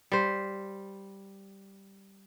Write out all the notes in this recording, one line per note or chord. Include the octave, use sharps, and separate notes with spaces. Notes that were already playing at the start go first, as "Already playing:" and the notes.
G3 C5